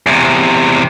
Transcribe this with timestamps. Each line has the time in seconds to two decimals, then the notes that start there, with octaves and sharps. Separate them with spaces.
0.07 E2 C3